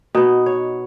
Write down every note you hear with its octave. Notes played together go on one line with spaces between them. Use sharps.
B2 B3 D#4
C#5